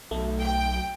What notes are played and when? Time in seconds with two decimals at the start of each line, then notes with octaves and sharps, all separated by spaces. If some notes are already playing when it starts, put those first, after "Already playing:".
0.11 B1 A3
0.42 G5